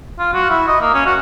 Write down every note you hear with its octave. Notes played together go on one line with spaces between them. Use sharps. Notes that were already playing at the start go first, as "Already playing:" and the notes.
F4
F#4
E4
D#5
A#3
C#4
F#4